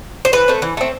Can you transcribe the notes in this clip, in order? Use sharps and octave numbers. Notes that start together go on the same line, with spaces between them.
C5
E3 B4
A3 C4
E3
A3 C4